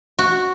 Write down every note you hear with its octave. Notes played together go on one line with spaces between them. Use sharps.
F#4